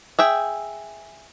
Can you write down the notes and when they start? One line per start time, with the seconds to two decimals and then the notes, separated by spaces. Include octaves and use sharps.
0.19 G#4 E5 G5